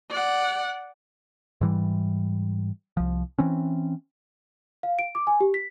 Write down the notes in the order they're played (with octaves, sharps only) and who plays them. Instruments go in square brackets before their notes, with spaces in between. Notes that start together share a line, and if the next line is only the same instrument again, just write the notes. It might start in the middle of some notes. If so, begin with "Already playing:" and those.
[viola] D5 F#5
[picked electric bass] G#2 E3 G3
C2 F3
E3 C4 C#4
[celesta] F5
D7
D6
G#5
G4
B6